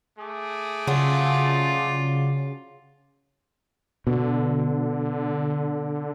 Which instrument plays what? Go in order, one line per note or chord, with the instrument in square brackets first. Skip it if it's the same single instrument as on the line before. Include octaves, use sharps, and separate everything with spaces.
[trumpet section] A3 G#4 D6
[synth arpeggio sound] C#3 [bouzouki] F3 F#3 D4 [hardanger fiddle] F4
[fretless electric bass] B2 [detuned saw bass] D3